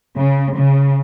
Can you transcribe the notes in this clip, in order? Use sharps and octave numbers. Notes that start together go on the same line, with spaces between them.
C#3
C#3